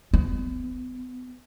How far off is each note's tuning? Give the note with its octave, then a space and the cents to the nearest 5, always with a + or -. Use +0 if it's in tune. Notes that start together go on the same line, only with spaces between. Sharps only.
B3 +35